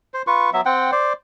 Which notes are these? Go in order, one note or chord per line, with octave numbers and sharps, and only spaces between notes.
C5
F4 B4 C#6
F#3 B3 E5
C4 F#5 G5
C5 D5